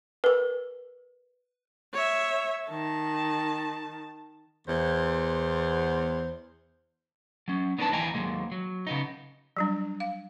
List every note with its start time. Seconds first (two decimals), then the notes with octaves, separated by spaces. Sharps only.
0.24 A#4 B4
1.94 C#5 E5
2.69 D#3 A5
4.68 E2 C5
7.48 F#3 C#4
7.78 B3 D4 D#4 A#4 B4 A5
7.92 D#2 E3 D#5 G5 G#5 A#5
8.14 D#2 F3 F#3 G#3 A#3
8.52 F#3
8.87 C#3 B3 D#4
9.57 F#3 G3 D4
10.00 F5